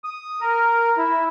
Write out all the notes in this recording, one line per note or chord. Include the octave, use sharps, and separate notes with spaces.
D#6
A#4
E4